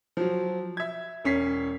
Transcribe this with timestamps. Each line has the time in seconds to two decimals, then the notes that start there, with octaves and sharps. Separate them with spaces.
0.17 F3 F#3
0.77 E5 G#6
1.24 E1 C#4 B6 C7